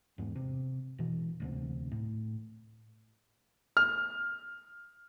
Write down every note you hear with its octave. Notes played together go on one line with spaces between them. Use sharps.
E2 G#2
C3
E1 B2 E3
E1 D2 C3
A2
F6